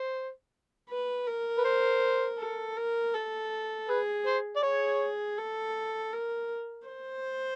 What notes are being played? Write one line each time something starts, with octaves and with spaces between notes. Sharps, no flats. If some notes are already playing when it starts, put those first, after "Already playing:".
Already playing: C5
B4
A#4
B4
C5
A4
A#4
A4
G#4 B4
C5
D5
G#4 C#5
A4
A#4
C5